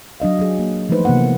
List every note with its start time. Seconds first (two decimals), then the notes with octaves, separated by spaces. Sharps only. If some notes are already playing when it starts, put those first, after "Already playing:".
0.20 F#3 D4 D#5 F5
0.39 F#3 G#4
0.59 A#3
0.89 E3 F3 A3 D#4 B4 C5
1.05 C3 E3 A#3 B3 F#5